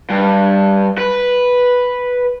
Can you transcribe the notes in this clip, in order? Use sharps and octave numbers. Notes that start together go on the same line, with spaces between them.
G2
B4